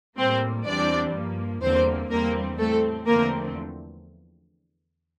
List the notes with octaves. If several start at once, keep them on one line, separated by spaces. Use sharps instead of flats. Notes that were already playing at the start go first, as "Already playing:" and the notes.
A2 G3 A#3 C4 C5
E2 E3 G3 C4 D4 D5
G2 F3 A#3
E2 D3 G3 A#3 C4 C5
E2 D3 G3 A#3 C4 A#4
A2 G3 A3 C4 A4
E2 D3 F3 A3 A#3 C4 A#4